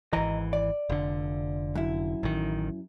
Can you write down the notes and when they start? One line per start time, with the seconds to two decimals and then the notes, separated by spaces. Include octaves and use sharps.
0.13 G#1 E3 D#5 A#5
0.53 D5
0.89 F1 D3
1.75 F#2 E4
2.23 A1 D#3